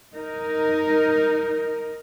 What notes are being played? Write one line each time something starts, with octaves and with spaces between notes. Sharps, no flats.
D#4 A#4